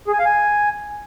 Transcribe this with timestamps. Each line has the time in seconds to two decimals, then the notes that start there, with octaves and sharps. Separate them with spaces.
0.07 G#4
0.13 G#5
0.19 F5
0.25 G#5